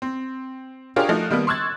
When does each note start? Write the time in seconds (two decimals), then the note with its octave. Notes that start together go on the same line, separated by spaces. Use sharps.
0.02 C4
0.96 D4 F4 G4 G#4 A#4 C#5
1.09 F3 A3 D#4 F#4
1.30 D#3 G3 A#3 B3
1.47 C6 C#6 E6 F#6 G#6 A6